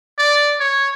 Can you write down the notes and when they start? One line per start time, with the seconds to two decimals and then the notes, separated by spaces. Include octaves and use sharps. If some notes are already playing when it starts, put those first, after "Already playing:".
0.18 D5
0.60 C#5